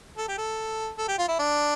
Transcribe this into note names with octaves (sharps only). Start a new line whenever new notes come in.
A4
G4
A4
A4
G4
F4
E4
D4